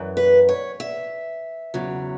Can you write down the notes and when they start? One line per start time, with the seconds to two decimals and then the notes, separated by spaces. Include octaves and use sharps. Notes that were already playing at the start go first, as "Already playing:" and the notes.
Already playing: F#2 E3
0.17 B4
0.49 C#5
0.80 E5
1.74 E2 C#3 F#3